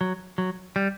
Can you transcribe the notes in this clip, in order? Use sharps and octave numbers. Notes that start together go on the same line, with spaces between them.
F#3
F#3
G3